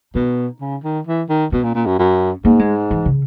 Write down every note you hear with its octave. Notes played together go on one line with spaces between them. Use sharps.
B2 D#4
C#3
D#3
E3
D#3
B2 C#4
A#2
A#2
F#2
F#2
G#2 A#3
G#3
E3
C#3